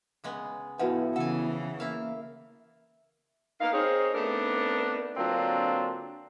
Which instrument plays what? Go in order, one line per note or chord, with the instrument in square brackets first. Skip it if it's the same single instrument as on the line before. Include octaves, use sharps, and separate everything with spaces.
[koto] C#3 G#3 B3
[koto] A2 F3 [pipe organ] B3 E4 [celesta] F#4 B4 F#5
[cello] C#3 E3 [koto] A4 G#5 [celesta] F#5
[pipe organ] A#3 [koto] E4 F5
[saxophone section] A#3 B3 D#4 F5
C4 D#4 G#4 A#4 C5 C#5
A3 B3 C4 D4 D#4 A#4
D3 F#3 A#3 C4 D4 F4